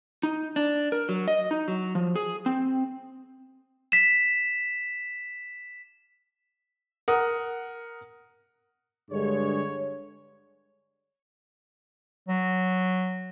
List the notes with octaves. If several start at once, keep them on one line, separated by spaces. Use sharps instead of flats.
D#4
D4
A#4
F#3
D#5
D#4
F#3
F3
G#4
C4
B6 E7
A#4 F#5 D#6
G2 D3 G#3 C#5
F#3